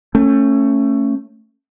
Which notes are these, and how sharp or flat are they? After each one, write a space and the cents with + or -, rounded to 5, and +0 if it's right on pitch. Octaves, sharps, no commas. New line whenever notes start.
A3 +20 C#4 -15